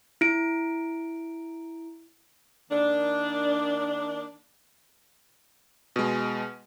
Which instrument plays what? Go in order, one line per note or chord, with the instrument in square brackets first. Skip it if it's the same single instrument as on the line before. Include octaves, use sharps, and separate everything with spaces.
[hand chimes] E4 D7
[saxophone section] D#3 A#3 D4
[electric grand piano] B2 G#3